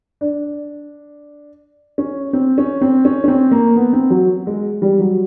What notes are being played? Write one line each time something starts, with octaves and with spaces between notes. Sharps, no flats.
D4
C#4
C4
C#4
C4
C#4
C#4
C4
A#3
B3
C4
F#3
G#3
G3
F#3